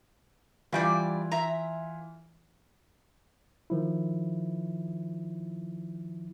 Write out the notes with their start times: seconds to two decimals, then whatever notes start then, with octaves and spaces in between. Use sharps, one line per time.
0.72 G2 E3 G3 F4 D5
1.31 E5 A#5
3.70 D#3 F3 E4